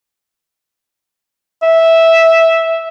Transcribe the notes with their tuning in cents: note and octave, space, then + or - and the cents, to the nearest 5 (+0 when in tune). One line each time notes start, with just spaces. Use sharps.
E5 -10